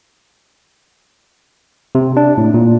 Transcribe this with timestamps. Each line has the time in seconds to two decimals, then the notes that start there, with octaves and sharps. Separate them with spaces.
1.95 C3
2.17 D4
2.38 A2
2.54 A#2